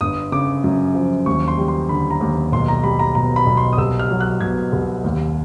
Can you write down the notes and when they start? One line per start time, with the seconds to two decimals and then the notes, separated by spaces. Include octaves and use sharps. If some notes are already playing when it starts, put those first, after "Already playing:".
0.01 G1 D#6
0.32 C#3 D6
0.64 F#2
0.95 F3
1.26 D#2 C#6
1.48 C6
1.58 G3
1.68 C6
1.89 D3 B5
2.11 A#5
2.21 D#2
2.52 B1 C6
2.68 A#5
2.84 G3 B5
2.99 A#5
3.15 B2 A#5
3.36 B5
3.47 B1
3.57 C6
3.73 D#6
3.78 C2 E6
3.99 F6
4.10 F#3
4.21 F#6
4.41 B2 G#6
4.73 C2
5.04 D#2